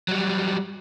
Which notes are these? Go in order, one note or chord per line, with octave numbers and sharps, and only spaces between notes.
F#3 G3